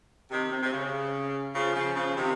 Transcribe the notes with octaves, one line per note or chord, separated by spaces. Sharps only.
C3 D#3
C3
C3
C#3
C#3 F3
C#3 F3
C#3 F3
C3 D#3